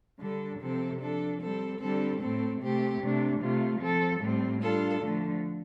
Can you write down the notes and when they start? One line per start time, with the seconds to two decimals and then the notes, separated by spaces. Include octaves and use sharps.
0.20 D3 G3 D4 A4
0.60 C3 F3 C4 A4
1.00 F3 D4 A4
1.41 G3 C4 A4
1.80 D3 G3 C4 A4
2.21 A2 A3 C4 A4
2.61 C3 A3 C4 G4
3.01 C3 A3 D4
3.40 C3 A3 F4
3.81 F3 C4 A4
4.21 A2 G3 C4
4.61 G3 D4 F4 A4
5.01 D3 F3 A3